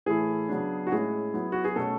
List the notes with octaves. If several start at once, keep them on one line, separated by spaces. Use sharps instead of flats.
A2 E3 A3 E4 G#4
C#3 F#3 B3 D4
F#4
A2 G#3 C#4 E4 G#4
F#3 B3 E4
F#4
G#4
B2 A3 C#4 A4